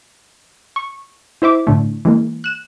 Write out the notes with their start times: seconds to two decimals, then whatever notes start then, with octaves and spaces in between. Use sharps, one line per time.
0.76 C#6
1.42 E4 C5 E5 D6
1.67 A2 D3 A3
2.05 E3 G#3 A#3
2.44 F#6 E7